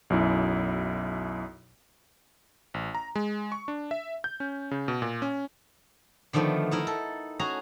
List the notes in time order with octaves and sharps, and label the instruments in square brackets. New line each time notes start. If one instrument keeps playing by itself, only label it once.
[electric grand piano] B1 F#2 E4
A1
A#5
G#3
C#6
D4
E5
G6
C#4
C#3
B2
A#2
C#4
[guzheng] D3 D#3 F3 A3 B3
D#4 E4 A#4
A4
C#4 F#4 G#4 A#5